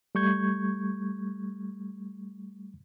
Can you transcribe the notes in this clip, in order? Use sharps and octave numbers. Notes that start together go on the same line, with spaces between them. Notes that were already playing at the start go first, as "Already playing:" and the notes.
G3 A3 C#6 G6 G#6